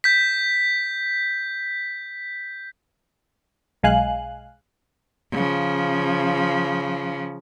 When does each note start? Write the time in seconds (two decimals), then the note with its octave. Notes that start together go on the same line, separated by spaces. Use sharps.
0.04 G6 B6
3.83 B1 G#3 F5 G#5 F#6
5.32 C#3 F3